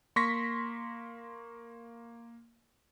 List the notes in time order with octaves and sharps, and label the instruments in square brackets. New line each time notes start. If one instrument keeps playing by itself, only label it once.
[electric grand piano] A#3 C6 C#6 A#6 B6